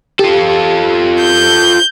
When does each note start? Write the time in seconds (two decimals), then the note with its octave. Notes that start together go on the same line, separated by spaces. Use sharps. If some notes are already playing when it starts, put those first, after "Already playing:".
0.19 F4 G4 A4
1.23 G6